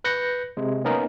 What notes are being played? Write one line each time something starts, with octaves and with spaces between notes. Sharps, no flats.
B4 F#6 G6 A#6 C#7
C3 G#3
A#3 B3 C#4 D#4 A#4 D#5